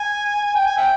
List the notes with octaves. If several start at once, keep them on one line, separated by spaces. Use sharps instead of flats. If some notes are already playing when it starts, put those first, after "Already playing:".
Already playing: G#5
G5
G#5
E5 G5